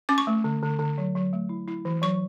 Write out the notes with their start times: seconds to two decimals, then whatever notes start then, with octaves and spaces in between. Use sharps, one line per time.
0.09 C#4 D6
0.18 C#6
0.27 A3
0.44 D3
0.63 D3
0.79 D3
0.98 F#3
1.15 F#3
1.33 A3
1.49 E4
1.68 E4
1.85 E3
2.02 F#3 C#6